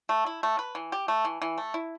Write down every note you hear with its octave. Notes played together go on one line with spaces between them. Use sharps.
A3
E4
A3
B4
E3
G4
A3
E3
E3
A3
E4